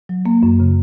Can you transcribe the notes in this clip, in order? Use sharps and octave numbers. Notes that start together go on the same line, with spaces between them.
F#3
A#3
F#2
C#3